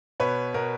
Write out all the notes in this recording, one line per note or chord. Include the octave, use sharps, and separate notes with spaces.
B2 B4 C#5
B2 A#4